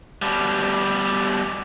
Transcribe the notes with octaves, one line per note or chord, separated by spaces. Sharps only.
B2 G3